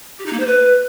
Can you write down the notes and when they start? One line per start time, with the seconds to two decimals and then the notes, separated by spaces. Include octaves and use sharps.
0.19 G4
0.26 D#4
0.33 A#3
0.40 C5
0.47 B4